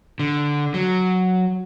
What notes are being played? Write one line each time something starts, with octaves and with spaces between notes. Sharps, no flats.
D3
F#3